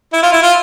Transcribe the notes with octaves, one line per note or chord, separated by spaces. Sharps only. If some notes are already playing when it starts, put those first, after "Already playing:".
E4
F4
E4
F4